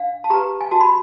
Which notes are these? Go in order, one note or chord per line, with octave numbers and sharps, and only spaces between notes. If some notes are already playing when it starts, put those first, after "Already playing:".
Already playing: D4 F5
A5
G4 B4 A#5
G#5
F#4 A5
B5